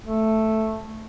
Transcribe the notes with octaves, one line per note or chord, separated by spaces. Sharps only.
A3